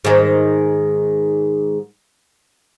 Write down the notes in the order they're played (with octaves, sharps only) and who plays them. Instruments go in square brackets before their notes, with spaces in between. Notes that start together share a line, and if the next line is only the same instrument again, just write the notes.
[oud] G#2 D#3